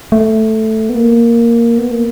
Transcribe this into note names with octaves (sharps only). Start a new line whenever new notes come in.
A3
B3
A#3
B3
A#3